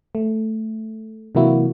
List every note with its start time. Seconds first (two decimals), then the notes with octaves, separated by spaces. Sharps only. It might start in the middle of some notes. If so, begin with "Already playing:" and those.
0.15 A3
1.35 C3 E3 F#3 A#3 E4 F#4